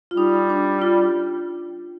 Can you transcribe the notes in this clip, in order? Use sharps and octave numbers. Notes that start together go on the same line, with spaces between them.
F4
G3 D#4
D4
F4